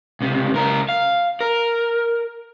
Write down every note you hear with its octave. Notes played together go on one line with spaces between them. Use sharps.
C#2 C3
C#2 A#4
F5
A#4